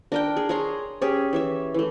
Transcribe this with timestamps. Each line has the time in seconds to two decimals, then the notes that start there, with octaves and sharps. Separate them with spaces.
0.12 D4 A#4 G5
0.36 G#4
0.49 G#4 C#5 A#5 C6
1.02 C#4 G4 G#4 C#5
1.33 E3 C#5 E5
1.74 E3 A3